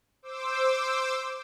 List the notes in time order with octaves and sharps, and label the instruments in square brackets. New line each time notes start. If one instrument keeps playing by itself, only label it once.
[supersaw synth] C5 D6 E6